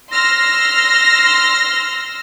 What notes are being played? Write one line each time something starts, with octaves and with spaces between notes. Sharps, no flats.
C6 E6 F6 A#6